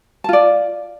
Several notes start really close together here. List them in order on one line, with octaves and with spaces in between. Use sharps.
A5 F4 D5